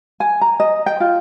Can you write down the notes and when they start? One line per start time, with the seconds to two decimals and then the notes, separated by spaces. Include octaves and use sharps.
0.20 G#5
0.41 A#5
0.60 D#5
0.86 G5
1.00 F4